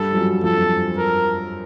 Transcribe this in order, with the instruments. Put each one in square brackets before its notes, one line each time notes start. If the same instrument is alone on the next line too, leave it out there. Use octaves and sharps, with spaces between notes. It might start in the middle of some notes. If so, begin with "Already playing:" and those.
Already playing: [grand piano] G2 G3 [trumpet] A4
[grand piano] F3
F#2 F#3
[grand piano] F2 F3 [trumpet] A4
[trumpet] A#4